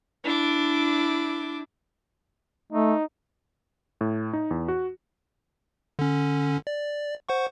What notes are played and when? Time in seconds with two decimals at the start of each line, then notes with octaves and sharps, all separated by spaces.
0.24 D4 E4 D6
2.72 A3 D#4
4.01 A2
4.33 D#4
4.51 E2
4.68 F#4
5.99 D3 C#4
6.67 D5
7.29 C5 F#5 C#6